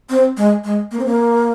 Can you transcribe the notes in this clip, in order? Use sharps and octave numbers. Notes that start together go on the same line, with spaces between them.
C4
G#3
G#3
A#3
C4
A#3